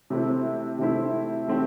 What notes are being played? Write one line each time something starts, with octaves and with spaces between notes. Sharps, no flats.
C3 A3 C4 E4
C3 A3 C4 E4
E3 A3 C4 G4